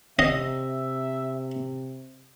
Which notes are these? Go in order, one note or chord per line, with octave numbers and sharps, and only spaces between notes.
C3 D#5 E5